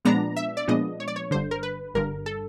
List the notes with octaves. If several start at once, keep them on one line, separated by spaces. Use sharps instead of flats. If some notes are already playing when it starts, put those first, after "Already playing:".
A#2 F3 G#3 B3 D4 A#5
E5
D5
A#2 F3 G#3 B3 D4 D#5
C#5
D5
C#5
G1 G2 D3 C5
A#4
B4
G1 G2 D3 A#4
A4